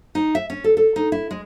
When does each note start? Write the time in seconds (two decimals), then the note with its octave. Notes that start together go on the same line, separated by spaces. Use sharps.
0.15 D#4
0.35 E5
0.50 C#4
0.64 A4
0.77 A4
0.96 D#4
1.12 E4
1.31 G#3